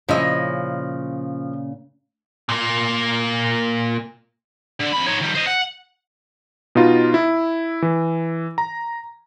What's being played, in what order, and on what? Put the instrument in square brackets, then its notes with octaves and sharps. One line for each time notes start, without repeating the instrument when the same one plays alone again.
[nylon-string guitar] A#2 C#3 C#4 [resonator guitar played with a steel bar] F3 E4 D#5
[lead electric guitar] A#2 A#3
[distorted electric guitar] D3
F2 B5
D#4 C#5
D#3 G3
C5 D#5
F#5
[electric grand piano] B2 D#4 F4
E4
E3
A#5